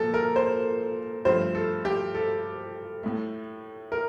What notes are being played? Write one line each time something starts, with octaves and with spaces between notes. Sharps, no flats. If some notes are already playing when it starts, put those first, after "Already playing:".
Already playing: A#2 F3 A4
A#4
C5
G2 F3 A3 C5
A4
G4
A4
A2 A3
A#4